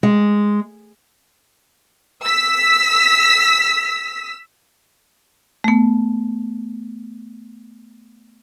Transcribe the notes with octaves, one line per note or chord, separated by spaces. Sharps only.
G#3
E6 B6
A3 B3